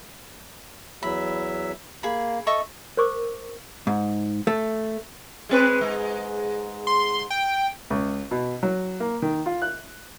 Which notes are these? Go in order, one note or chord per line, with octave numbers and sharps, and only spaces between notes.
E2 F#3 E5 B5
A#3 G#4 B5
A4 D#5 E5 C#6
A#4 C5 C#6 D6 E6
G#2
A3
G#3 C4 B4
G#2 G#3
C6
G5
C#2
B2
F#3
A#3
D#3
F4
F#6